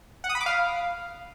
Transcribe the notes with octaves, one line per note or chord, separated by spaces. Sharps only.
F#5
D#6
B5
D6
F5